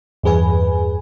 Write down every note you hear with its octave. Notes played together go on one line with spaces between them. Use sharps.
E2 G2 G#4 B4 G#5